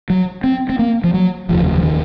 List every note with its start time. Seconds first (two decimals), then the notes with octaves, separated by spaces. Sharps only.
0.10 F#3
0.44 C4
0.69 C4
0.79 A#3
1.04 F3
1.14 F#3
1.49 F1 D#2 C#3 F3
1.78 F3
1.83 D#3